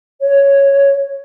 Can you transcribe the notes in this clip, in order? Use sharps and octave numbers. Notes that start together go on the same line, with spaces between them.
C#5